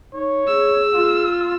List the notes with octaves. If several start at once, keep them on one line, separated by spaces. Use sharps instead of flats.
D#4 C#5
G#4 E6
F4